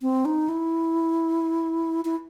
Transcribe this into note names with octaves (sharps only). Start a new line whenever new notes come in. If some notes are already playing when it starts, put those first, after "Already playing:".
C4
D#4
E4
E4